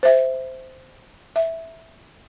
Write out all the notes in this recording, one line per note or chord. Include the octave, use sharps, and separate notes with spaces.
C5 E5
E5